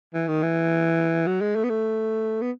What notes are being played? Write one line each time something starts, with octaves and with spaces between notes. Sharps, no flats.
E3
D#3
E3
F#3
G#3
A3
B3
A3
B3